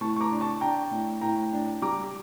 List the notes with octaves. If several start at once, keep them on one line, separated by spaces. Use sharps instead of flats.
A2 A5 C#6
C#6
A#5 D6
D4
A5 C#6
D4 G5 A#5
A2
A2 G5 A#5
D4
G3 A#5 D6